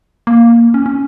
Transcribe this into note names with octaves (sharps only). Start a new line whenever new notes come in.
A#3
C#4
C#4